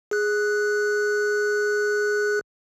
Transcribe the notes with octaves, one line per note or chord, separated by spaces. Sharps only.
G#4 F#6